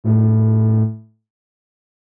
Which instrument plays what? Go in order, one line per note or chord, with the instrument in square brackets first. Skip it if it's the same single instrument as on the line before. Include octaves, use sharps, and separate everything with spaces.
[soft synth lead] A2